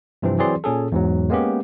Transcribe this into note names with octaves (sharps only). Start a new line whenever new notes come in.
G2 C3 E3 F3 C4
E3 F#3 C4 G#4 D5 C6
A#2 C#4 G#4 A4
E2 G#2 F#3
G#3 A#3 B3 C#4 G4